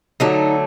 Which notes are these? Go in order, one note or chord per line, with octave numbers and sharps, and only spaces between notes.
D3 F#3 A3 D#4